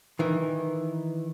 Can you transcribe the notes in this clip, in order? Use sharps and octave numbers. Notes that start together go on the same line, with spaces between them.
D#3 E3